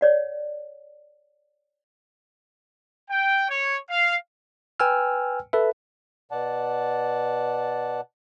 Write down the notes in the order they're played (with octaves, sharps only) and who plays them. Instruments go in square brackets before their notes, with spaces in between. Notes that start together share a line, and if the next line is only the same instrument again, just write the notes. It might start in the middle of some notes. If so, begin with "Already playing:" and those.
[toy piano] C#5 D5 F#5
[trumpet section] G5
C#5
F5
[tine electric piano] B4 G5 G#5 E6 F6
A4 B4 E5
[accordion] B2 D5 F#5 A5